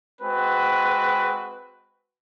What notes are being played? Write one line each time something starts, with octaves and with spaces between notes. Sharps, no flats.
G#3 C4 F#4 B4